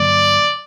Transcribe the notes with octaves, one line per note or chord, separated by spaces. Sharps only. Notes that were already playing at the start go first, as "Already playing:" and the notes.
Already playing: G2 D3 F#3 A#3 D5